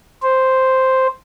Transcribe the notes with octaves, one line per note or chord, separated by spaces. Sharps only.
C5